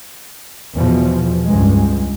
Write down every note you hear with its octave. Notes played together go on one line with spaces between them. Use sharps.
E2 B2 F3
C#2 G2 G#3